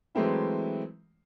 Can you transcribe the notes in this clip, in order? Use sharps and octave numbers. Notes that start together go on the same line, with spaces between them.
E3 F#3 G#3 A3 C4 E4